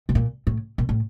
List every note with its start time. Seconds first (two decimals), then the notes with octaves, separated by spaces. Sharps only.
0.09 C3
0.15 A#2
0.47 A2
0.78 A#2
0.89 A2